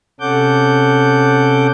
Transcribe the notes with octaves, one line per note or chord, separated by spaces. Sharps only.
C3 C#4 A4 F#5 D6 G6